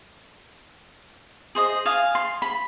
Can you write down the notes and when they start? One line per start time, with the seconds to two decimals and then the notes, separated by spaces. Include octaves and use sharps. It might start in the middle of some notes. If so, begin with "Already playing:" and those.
1.55 G#4 C5 D#5
1.86 F5 G#5 D#6
2.15 C6
2.42 B5